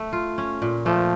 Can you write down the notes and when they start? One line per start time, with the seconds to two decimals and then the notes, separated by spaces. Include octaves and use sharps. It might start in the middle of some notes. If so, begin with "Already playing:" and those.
Already playing: A3
0.13 F4
0.38 C#4
0.62 A#2
0.85 F3 A3